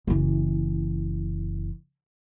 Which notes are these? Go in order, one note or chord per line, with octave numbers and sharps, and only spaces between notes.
F#1 E3